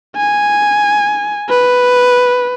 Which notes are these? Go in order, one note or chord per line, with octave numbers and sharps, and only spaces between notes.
G#5
B4